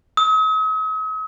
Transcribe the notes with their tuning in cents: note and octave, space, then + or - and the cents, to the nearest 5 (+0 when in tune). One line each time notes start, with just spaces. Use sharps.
D#6 +45